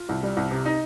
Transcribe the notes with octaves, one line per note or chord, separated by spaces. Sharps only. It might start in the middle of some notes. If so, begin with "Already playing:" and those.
Already playing: F4
C2
G3
C2
C3
D#4